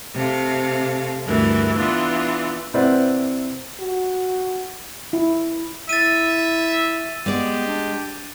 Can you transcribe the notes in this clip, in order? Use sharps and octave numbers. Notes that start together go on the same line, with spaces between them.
C3 A3 F5
D2 G2 E3 A#4
E3 B3 D4 F4
C3 E4 B4 C5 D5 F#5
F#4
E4
E4 E5 A6 D#7
G#3 B3 G4 D5
D4